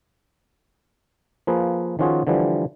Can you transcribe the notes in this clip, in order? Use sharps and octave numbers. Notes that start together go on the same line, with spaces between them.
F3 A#3 G#4 B4
D#3 F3 C#4 F4 F#4 G#4
D3 E3 F3 G3